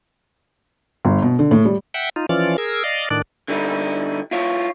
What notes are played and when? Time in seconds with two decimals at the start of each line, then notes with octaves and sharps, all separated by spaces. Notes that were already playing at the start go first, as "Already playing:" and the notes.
1.05 G1
1.22 B2
1.39 D3
1.51 A2
1.65 G3
1.94 E5 F#5 G5
2.16 D#4 F4
2.29 E3 F3 C#4 F4 D5 D6
2.58 G#4 A#4 E6
2.84 D5 D#5 F5
3.10 A2 D#3 D4 D5
3.48 D3 G3 D#4 E4
4.31 E4 F4 C#5